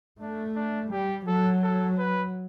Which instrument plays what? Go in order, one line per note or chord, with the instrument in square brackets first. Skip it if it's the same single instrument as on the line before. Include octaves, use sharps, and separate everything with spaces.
[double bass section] A3 [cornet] D4
[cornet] D4
[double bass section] G3 [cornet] G4
[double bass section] F#3 [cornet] A4
[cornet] A4
B4